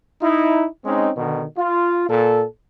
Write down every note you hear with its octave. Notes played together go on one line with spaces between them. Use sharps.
D#4 E4
G#3 C4 C#4 D#4
B2 D3 D#3
F4
A#2 A4